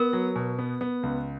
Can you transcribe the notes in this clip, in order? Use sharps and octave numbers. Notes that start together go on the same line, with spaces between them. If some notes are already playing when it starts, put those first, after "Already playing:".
Already playing: B3 A#4
F#3
B2
B3
B3
C#2